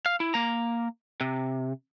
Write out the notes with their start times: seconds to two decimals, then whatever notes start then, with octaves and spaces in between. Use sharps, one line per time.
0.06 F5
0.20 E4
0.34 A#3 A#5
1.21 C3